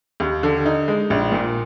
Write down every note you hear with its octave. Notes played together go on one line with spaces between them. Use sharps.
D#2
D3
D#4
G#3
A#1
A#2